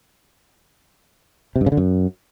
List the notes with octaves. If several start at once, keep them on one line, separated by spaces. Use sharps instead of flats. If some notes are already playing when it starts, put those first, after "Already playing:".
C3
G2
C#3
D3
F#2